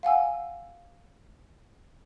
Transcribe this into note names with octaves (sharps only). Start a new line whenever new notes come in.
F5 F#5 G#5 E6